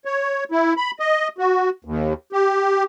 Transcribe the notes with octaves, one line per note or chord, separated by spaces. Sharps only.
C#5
E4
B5
D#5
F#4
D#2
G4